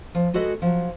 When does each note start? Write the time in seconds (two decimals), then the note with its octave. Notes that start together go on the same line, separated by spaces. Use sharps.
0.15 F3
0.34 G#3 F#4 A4 B4 D#5
0.62 F3 F#3